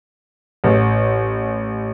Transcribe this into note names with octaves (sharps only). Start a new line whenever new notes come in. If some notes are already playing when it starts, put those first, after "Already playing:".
A1